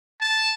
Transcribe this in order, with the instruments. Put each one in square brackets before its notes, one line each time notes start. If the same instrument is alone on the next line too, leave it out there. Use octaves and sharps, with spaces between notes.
[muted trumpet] A5